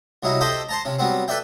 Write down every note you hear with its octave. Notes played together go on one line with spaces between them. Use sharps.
C2 F#3 D#4 E4
G4 A4 C5 D#5 E5 G5
C5 A5 A#5
C3 C#4
F#3 G3 B3 C4
A4 B4 D5 E5 G5